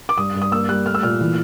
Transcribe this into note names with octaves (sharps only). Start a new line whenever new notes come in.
D6
G2 D#6
G2
D#6
A#3 E6
G3 F#6
A3 F6
E6
A#2 F6
E3